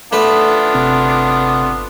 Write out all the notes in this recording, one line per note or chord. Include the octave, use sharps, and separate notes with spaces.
A3 B3 D4 F4 B4
G1 C3 C4